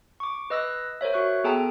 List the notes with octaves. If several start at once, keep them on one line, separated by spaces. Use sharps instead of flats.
C#6 D6
B4 D#5 E6 F#6 A#6
A#4 C5 C#5 E5
F#4 C#6 F#6
B3 G#4 A4 G5 A5 A#5